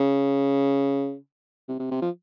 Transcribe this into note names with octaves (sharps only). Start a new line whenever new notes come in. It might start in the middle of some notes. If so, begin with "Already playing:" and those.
Already playing: C#3
C3
C3
C3
F3